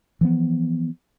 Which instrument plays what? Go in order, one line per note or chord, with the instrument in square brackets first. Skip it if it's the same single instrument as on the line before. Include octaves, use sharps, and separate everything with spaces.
[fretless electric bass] E3 F3 B3